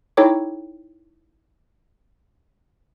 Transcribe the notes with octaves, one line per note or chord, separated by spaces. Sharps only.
D#4 E4 A4 C#5 G5 D6